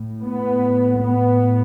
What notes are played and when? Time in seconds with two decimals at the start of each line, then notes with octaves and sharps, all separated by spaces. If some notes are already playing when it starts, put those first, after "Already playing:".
Already playing: A2
0.24 B3
1.03 B3